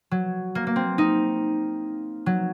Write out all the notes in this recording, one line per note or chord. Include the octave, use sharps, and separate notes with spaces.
F#3
A#3
A#3
C4
D#4
F#3